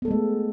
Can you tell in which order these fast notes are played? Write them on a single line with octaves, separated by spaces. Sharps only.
B3 A4 A3 G#3